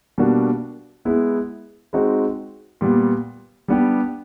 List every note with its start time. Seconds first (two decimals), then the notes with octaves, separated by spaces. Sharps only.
0.18 B2 G3 A#3 D4 F#4
1.05 G#3 B3 E4
1.93 G#3 C4 D#4 F#4
2.81 A#2 G3 B3
3.68 G3 B3 D4 G4